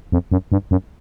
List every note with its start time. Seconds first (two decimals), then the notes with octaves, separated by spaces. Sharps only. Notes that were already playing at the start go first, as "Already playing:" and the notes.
0.12 F2
0.32 F#2
0.52 G2
0.71 F#2